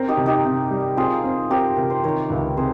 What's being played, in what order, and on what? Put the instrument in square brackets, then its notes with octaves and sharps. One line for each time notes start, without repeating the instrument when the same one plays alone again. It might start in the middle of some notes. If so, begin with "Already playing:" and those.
Already playing: [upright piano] C4 [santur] A#4
[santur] D#4 G4
[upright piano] C3
[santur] D#4 G4
[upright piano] C3
G3
[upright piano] C4 [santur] F4 G#4
[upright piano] C4
[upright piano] C4 [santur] G4 A#4
[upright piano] C3 [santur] A#4
[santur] C5
[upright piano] D#3 [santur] A#4 C#5
[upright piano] C#2
[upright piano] C3 [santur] G#4 C5